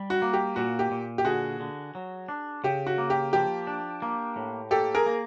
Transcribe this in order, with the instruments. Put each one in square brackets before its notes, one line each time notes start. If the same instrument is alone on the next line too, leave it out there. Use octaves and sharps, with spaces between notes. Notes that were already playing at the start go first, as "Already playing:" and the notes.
Already playing: [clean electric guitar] G3
[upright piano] F#4
[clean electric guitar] A#3
[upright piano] G4
[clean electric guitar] A#2 [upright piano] F#4
[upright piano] G4
[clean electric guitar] A#2
[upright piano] G4
[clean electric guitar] D3 [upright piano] F#4 G#4
[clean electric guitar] D3
F#3
D4
[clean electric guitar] C#3 [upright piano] G4
[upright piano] F#4
[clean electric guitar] A#3
[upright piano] G4
[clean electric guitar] F3 [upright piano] G4
[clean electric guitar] D4
A#3
A2
[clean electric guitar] A#3 [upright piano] G4 A4
[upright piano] G#4 A#4
[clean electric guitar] A#3